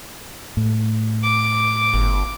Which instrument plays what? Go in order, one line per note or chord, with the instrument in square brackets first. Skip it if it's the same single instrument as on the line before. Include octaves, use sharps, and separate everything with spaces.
[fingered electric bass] A2
[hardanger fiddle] D6
[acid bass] G1